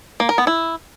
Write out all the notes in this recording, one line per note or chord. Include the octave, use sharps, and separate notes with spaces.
A#3
A#4
B3
E4